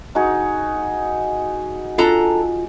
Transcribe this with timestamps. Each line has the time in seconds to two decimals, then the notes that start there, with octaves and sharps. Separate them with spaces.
0.15 D#4 F#4 G#4
1.98 D4 F4 A4 A#5